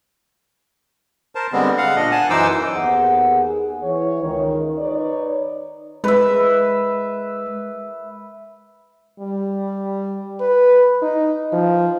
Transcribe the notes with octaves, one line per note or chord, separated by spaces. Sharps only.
A#4 C5 A5
D3 G3 G#3 B3 C4
F5 F#5
A#2 D4 D#5
F#5 G#5 A5
F#2 E3 D#4 C5 D6 E6
D#2 B3 G#4 F#5
G#4
E3 C#5
C#2 D#3
D#4 B4 C#5 D5
G#3 B4 E5
G3
B4
D#4
F3